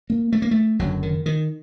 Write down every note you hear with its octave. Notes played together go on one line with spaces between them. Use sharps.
A#3
A3
A#3
A3
F#1 F#2 D3 F#3
D#3
D#3